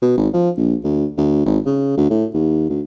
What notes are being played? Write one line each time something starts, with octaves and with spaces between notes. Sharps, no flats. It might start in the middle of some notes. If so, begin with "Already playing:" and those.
B2
G#1
F3
A#1
D2
D2
G#1
C#3
D2
A2
D#2
D2